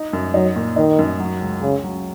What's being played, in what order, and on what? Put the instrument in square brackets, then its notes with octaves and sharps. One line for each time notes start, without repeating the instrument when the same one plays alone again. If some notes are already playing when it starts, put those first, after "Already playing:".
Already playing: [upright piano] D#4
F#2
[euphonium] F#3 [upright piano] D#4
[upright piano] A#2
[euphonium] D#3 [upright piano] D#4
[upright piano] F#2
F#3
C#2
[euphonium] C#3 [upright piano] C#4
[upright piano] F#3